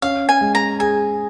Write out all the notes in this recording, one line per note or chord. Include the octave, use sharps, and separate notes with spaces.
C#4 F5
G#5
G#3
A#5
G#4 G#5